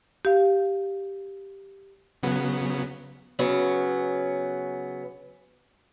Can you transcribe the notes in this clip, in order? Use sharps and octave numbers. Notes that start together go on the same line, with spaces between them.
G4 F5
C#3 F#3 B3
C#3 F#3 B3 C#4